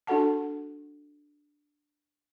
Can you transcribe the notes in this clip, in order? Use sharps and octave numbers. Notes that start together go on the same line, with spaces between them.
D4 F#4 A4 F#5 A5